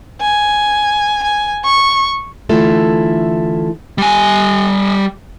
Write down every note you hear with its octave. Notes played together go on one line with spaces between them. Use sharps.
G#5
G#5
C#6
D3 E3 A3 E4 F4 A4
G3 G#5